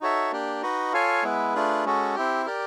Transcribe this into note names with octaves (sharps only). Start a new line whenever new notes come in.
D#4 F#4 A4 C#5 E5
A#3 D4 G4
D#4 F#4 B4 D#5
F4 A4 C#5 F5 G#5
G#3 B3 E4
A3 D4 F4 G#4 B4
G#3 C#4 F#4 A4
C4 E4 G4
G4 A#4 D5